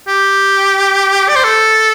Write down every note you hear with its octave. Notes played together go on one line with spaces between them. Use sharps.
G4
D5
C5
A4